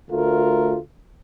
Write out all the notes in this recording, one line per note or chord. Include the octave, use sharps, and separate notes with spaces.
D2 A3 F4 A#4